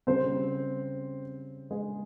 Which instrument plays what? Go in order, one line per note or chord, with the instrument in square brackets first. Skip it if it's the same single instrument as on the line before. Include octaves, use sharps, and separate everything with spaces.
[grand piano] C#3 G3 C#4 [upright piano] C4 C5
[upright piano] G#3 G#4